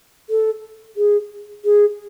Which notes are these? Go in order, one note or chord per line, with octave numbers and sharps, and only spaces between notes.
A4
G#4
G#4